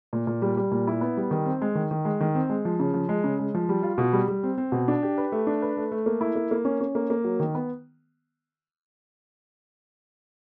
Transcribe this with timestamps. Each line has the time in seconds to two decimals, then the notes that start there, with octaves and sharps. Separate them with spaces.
0.13 A#2
0.27 A#2
0.42 G3
0.57 G3
0.71 A#2
0.87 E4
1.01 B3
1.17 G3
1.31 D#3
1.46 C4
1.62 G#3
1.75 D#3
1.91 D#3
2.05 G#3
2.21 D#3
2.35 C4
2.50 G#3
2.65 F3
2.80 C#3
2.94 F3
3.09 G#3
3.24 C#3
3.39 G#3
3.54 F3
3.69 G3
3.83 F4
3.98 B2
4.13 G3
4.28 G3
4.43 C4
4.58 C4
4.72 B2
4.88 D4
5.03 G4
5.18 B4
5.32 A3
5.47 D4
5.62 B4
5.77 A3
5.91 A3
6.06 A#3
6.21 E4
6.36 A#3
6.51 A#3
6.65 C#4
6.81 C#4
6.95 A#3
7.10 A#3
7.24 F#3
7.40 D#3
7.55 B3